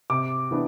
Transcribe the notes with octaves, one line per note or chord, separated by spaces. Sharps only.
C3 D6
E3 B3 D4